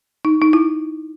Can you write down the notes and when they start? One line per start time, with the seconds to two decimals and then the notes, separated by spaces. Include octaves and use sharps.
0.25 D#4
0.42 D#4
0.53 E4